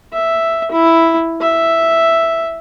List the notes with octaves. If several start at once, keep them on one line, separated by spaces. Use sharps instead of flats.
E5
E4
E5